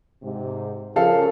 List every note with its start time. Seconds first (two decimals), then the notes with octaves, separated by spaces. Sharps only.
0.23 G#2 C3
0.96 C#3 F3 A4 A#4 F5